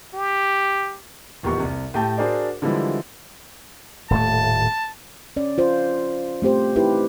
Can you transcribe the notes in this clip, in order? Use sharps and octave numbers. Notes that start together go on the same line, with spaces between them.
G4
D#1 E2 D#3 G4 C#6
C2
A2 G4 G5 A5
D4 F#4 G#4 A#4 C5 D5
D3 E3 F3 G3 G#3 E4
D#1 A2 A3 A5
C#4 D5
F4 C5
A3 C4 G4 C5
D#4 E4 G4 B4